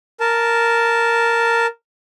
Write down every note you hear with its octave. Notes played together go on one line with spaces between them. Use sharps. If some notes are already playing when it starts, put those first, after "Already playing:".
A#4 A5